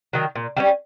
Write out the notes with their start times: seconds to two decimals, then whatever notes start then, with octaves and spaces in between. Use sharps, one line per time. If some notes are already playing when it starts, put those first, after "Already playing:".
0.13 D#3 F#3
0.35 A#2
0.57 G3 A#3 C#4